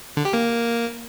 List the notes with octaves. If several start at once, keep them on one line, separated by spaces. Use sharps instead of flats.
D3
G4
A#3